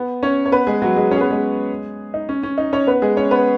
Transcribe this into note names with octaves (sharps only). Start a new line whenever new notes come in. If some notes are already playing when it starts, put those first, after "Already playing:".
Already playing: B3
C#4 C#5
C#5
B3 B4
G#3 G#4
F#3 F#4
G#3 G#4
C#4 C#5
G#4
B3 B4
G#3 G#4
D#4
C#4
C#4
D#4
C#4 C#5
B3 B4
G#3 G#4
C#4 C#5
B3 B4